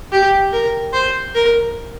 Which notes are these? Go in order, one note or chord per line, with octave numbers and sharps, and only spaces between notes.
G4
A#4
C5
A#4